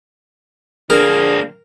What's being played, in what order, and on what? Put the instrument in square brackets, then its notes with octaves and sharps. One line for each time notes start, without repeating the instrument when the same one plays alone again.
[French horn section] D3 F3 D4 [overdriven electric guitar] A#3 C4 [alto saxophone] G#4 [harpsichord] A#4